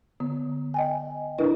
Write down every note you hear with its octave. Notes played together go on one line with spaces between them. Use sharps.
D3 B3
D#5 G5 G#5
D4 E4 A#4 B4 D#5